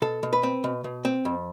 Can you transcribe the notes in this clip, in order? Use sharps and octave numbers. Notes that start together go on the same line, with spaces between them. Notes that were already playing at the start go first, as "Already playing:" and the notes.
B2 A4
B2
B4
C4
B2
B2
C4
F2